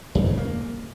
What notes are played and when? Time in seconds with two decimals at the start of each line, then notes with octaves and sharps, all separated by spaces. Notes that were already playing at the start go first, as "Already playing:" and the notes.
0.15 F2
0.26 C#3
0.37 A#3